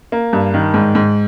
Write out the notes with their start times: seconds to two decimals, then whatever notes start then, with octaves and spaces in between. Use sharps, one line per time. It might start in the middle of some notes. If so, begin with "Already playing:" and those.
0.12 A#3
0.33 G2
0.54 D#3
0.74 G#2
0.95 G#2